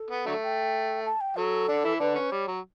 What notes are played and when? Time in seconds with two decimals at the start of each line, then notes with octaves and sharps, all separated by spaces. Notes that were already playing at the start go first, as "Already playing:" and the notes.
Already playing: A4
0.10 B3
0.26 D3 F#3 A3
0.43 G5
1.05 A5
1.21 G5
1.37 F#3 A4
1.68 D3 D4
1.84 E3 E4
2.00 D3 D4 B4
2.15 C#4
2.31 G3 C#5
2.48 F#3